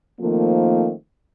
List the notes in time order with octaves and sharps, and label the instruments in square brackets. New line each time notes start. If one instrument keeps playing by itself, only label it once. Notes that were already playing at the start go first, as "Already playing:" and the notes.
[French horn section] D#3 F3 A3 A#3 C4